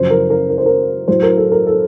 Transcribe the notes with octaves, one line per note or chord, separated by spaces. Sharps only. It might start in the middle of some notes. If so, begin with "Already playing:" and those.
Already playing: F#2 C#3 F3 C5
A#4
A#4
A#4
C5
A#4
A2 F#3 C5
A#4
A4
A#4
A4